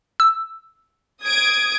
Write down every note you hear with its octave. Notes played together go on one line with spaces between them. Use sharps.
E6
D#6 G#6 D7